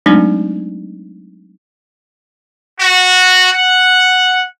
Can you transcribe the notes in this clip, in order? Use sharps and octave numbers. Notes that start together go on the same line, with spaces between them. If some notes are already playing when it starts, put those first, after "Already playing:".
F#3 G#3 A3 C4 D4 D#4
F#4
F#5